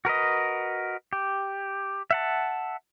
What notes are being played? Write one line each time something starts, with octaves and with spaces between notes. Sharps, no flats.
F#4 A#4 B4 D#5
G4
E5 F#5 A5